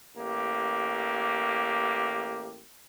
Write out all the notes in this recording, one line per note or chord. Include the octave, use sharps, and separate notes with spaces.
A1 A#3 G4